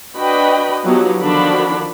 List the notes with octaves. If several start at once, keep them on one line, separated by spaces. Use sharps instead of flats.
D4 F#4 B4 D#5 G5 B5
F3 F#3 B3 D#4 F#4 G4
D3 D#3 F3 D4 F#4 B5